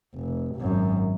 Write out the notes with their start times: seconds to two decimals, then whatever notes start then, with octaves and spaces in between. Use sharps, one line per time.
0.15 F1
0.56 G#1 F#2